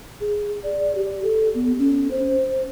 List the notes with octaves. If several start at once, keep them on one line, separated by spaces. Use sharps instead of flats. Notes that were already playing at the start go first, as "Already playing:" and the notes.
G#4
D5
G4
A4
B3
C#4
C5